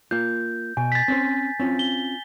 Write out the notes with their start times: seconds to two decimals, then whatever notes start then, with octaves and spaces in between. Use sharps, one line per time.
0.11 A#3 F4 G6
0.77 B2 G#5
0.92 A6 B6
1.08 C4 C#4 C5
1.60 C4 C#4 F4
1.79 G7